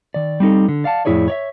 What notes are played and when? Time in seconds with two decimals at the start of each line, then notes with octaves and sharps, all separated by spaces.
0.14 D#3 D5
0.40 G3 C4 D#4 A4
0.69 D3
0.84 D5 F5 F#5 A5
1.05 F2 A2 E4 G#4 C#5 D5
1.28 C#5 D5 E5